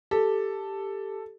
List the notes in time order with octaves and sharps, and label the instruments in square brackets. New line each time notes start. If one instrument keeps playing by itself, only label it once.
[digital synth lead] G4 [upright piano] A4